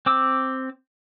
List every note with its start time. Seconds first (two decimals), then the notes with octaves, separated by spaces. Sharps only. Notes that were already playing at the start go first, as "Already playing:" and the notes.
0.06 C4 D6 E6